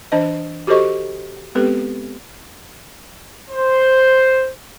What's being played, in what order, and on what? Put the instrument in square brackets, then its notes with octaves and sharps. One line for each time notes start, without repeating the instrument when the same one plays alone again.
[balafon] E3 D4 C5 D#5
F#4 G4 A4 C5 D#5 C#6
G#3 B3 C4 G4 A4 B4
[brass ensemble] C5